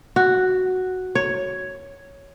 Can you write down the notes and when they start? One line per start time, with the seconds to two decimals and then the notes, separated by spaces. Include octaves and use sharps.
0.16 F#4
1.15 C#5